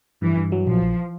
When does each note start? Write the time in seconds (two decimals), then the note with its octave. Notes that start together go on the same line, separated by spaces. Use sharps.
0.22 G2 E3
0.37 G2
0.52 F#3
0.67 A#1 F3
0.82 A#1